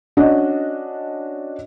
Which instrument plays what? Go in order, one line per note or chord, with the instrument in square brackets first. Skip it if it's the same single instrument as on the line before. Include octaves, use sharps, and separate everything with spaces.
[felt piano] C#4 D4 F#4 D#5